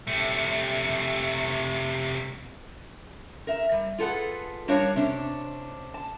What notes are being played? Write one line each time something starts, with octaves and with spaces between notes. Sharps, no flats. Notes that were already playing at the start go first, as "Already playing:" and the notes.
C3 A3
A#4 E5
G3
F4 G#4 A4 B4 F#5
G3 D4 F#4 A#4 C#5 F5
C3 C#4 D4
A5